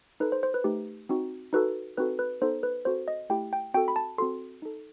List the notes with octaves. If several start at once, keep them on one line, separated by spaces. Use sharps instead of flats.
D#4 A4 B4
C5
C5
B4
A3 D#4 G4
C4 D#4 F#4
D#4 F#4 A4 B4
C4 D#4 F#4 A4 B4
B4
B3 D#4 A4 C5
B4
C4 F#4 A4 C5
D#5
A3 E4 G4 G5
G5
C4 F#4 A4 G5
B5
A5
C4 F#4 A4 C6
D#4 A4